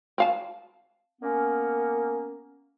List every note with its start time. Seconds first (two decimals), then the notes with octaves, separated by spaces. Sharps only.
0.18 C4 F5 A5
1.22 A#3 B3 C#4